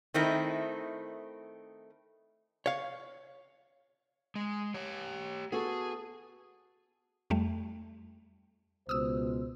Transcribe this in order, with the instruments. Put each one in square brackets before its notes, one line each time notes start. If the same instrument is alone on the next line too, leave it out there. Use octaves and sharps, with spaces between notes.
[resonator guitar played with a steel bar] D#3 A3 C4 D#4 E4
[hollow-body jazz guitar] C#5 F5
[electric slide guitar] G#3
G4 C#5
[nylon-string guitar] B3 F#4 A4 [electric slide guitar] G#4
[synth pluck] F2 G3 A3
[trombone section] C#2 B2 C5 [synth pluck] D#6 E6